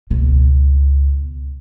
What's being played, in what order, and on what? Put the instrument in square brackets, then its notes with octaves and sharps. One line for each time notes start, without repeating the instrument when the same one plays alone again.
[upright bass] C#2 B2